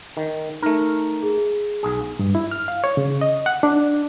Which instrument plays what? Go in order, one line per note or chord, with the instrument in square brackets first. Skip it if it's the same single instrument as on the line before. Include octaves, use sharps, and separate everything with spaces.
[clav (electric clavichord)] D#3
[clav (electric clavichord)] A3 A#4 [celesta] D#4
[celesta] G#4
[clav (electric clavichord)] B1 G#4
[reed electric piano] G2
E4
F6
F5
C#5
C#3
D#5
F#5
D4